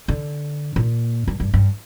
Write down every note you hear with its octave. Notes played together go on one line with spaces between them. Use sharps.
D3
A#2
G2
G2
G2